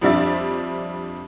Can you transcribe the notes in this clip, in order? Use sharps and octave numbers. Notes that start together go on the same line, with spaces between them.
F2 F3 G3 D4 E5 A6